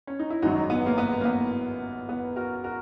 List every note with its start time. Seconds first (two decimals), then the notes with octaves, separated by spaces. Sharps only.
0.07 C#4
0.19 D#4
0.30 E4
0.42 G#1 F#2 D#3 F#3 D#4 F#4
0.70 B3
0.86 A#3
0.98 B3
1.21 A#3
1.25 B3
2.09 B3
2.36 F#4 A#4
2.64 F#4 A#4